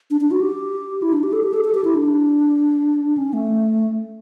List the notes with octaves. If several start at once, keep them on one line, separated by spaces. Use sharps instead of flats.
D4
D4
F#4
G4
E4
D4
G4
A4
G4
A4
A4
G4
E4
D4
C#4
A3